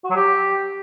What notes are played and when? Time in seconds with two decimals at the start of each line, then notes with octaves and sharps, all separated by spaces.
0.04 F#4
0.10 F#3
0.16 G4